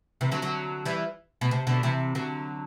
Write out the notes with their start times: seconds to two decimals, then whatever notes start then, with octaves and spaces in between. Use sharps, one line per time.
0.21 C3 E3
0.32 D3 F#3
0.42 D3 F#3
0.85 E3 G3
1.41 B2
1.51 C3
1.67 B2 D3
1.83 C3 E3
2.15 D3 F#3